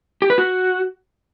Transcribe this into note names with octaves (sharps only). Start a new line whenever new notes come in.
G4
B4
F#4